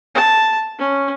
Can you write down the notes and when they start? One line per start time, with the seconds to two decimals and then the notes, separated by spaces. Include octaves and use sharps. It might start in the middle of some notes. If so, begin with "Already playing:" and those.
0.15 A5
0.79 C#4